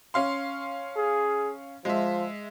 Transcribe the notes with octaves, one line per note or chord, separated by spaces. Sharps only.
C#4 F5 C6
G#4
F3 G#3 E5